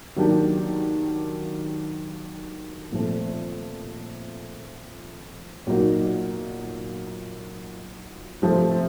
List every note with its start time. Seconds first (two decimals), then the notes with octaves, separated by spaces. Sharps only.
0.16 D#3 F#3 A#3 D4 G4
2.92 A#2 F3 A3 C4
5.67 A#2 F#3 A#3 D#4 F#4
8.42 C3 F3 A3 C4